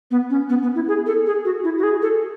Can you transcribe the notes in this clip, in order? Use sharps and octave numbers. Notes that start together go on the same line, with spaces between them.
B3
C#4
B3
B3
E4
G#4
A4
G#4
F#4
E4
F#4
G#4
A4